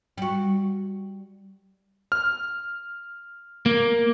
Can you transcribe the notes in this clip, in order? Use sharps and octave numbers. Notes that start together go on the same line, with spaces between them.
G3 F#4
F6
A#3